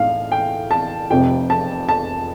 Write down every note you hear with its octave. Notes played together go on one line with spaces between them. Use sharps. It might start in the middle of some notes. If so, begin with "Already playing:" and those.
Already playing: A2 D#4 F5
G5
A5
F1 F2 C3 F3 G5
A5
A5